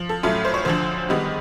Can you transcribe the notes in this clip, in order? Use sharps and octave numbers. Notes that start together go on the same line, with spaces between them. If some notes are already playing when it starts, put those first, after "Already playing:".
Already playing: F3
A4
A2 F#3 A3 C#4 F4
C5
C#5
D2 D3 F3 C5
G#2 D#3 G3 B3